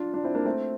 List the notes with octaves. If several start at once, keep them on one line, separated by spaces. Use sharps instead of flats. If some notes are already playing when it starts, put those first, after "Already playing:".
Already playing: D4 F4
D4 F4
C4 E4
A#3 D4
A3 C4